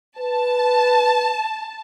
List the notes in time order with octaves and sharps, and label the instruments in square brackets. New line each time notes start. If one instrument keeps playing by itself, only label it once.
[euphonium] B4 [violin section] A5